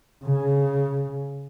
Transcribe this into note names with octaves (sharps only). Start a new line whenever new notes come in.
C#3